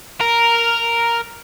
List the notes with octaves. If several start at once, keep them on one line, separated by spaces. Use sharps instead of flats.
A#4